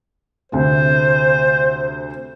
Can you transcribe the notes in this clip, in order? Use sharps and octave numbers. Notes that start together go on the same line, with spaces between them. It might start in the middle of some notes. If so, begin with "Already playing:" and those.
D2 C3 C4 C5